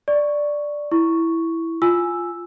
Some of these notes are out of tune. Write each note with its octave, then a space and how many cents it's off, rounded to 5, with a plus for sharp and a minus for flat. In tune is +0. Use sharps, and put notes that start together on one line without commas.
D5 +0 C#6 +0
E4 +0 C#6 +0
F4 +0 G#5 +5 E6 +0